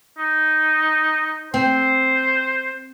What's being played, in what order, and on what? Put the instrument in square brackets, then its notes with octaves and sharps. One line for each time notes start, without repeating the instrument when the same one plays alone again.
[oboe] D#4
[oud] C4 [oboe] C5